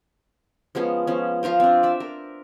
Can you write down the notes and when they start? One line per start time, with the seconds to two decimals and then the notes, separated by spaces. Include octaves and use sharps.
0.75 F3 G#3 B3 C#4
1.07 F3 B3 C#4
1.43 F3 F4 A#4 C5
1.60 C4 D4
1.83 D5 E5
2.00 A#4